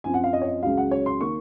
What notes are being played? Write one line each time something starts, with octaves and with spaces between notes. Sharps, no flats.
F#2 F3 C4 G#5
F#5
F5
D#5
C#5
D#5
C#2 C#3 F#3 F5
F#5
C#5
C6
D#3 A#3 C#6